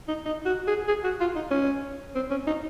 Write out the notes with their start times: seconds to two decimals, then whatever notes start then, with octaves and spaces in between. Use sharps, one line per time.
0.08 D#4
0.25 D#4
0.45 F#4
0.67 G#4
0.88 G#4
1.04 F#4
1.20 F4
1.36 D#4
1.51 C#4
2.15 C4
2.31 C#4
2.47 D#4